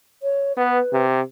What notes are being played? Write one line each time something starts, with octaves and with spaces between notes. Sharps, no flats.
C#5
B3 B4
C3